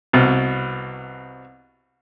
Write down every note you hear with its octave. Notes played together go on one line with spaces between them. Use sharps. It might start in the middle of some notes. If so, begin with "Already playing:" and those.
C2 B2